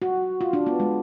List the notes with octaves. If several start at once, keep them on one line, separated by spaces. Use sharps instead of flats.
F#4
F4
D4
B3
G#3